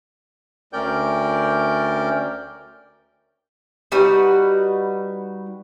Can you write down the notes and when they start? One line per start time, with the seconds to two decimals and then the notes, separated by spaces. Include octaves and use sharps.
0.73 D2 C#4 A#4 D5 G5 G6
3.92 G3 D#4 F#4 B4